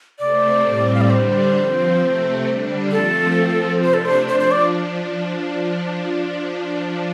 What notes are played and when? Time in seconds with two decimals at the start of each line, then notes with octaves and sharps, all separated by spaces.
0.19 C3 A3 C4 D5
0.64 A2 G3 C4
0.94 F5
1.01 D5
1.09 D3 G3 D4 C5
1.56 F3 C4
2.01 C3 A3 C4
2.46 D3 G3 D4
2.91 F3 A3 C4 A4
3.37 F3 C4
3.82 C3 A3 D4 C5
3.94 A4
4.05 C5
4.28 F3 D4 C5
4.40 C5
4.51 D5